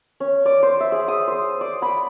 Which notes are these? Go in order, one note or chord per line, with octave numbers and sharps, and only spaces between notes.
C#4
D5
C5
E5
G#4
D#6
C5
D5
B5